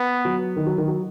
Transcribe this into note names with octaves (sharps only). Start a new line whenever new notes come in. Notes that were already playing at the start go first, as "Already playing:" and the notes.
Already playing: B3
F#3
D#3
F#3
D#3
F#3